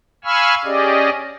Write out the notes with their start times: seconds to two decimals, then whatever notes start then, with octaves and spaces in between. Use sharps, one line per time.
0.24 F5 G#5 B5 C#6 E6 F6
0.65 C#4 G4 G#4 D5 D#5